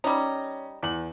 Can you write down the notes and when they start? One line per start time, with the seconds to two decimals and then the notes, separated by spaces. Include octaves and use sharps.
0.04 G3 C#4 D#4
0.83 E2 F#7